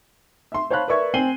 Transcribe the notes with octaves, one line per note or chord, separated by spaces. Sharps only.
E5 C6
C5 C#5 F5 A5 B5 F#6
A#4 B4 D5 E5 C#6 G#6
C4 G#5 C7 D#7 F#7 G7